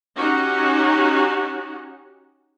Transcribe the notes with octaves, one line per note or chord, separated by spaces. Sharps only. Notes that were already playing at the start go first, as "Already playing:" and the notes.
C#4 D#4 F#4 G4